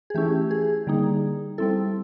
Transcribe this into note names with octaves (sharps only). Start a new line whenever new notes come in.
G#4
E3 A3 C#4 E4 G4
G#4
D3 G3 A#3 D#4
G3 C4 E4 A4